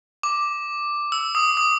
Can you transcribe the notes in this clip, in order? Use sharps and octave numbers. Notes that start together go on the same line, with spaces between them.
D6
E6
D#6
D#6